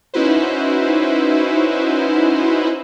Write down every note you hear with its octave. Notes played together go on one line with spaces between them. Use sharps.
C#4 D#4 E4 F#4 B4 C5